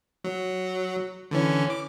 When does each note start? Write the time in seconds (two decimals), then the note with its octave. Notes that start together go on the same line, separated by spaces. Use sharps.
0.24 F#3
1.31 D3 E3 C#4
1.70 D6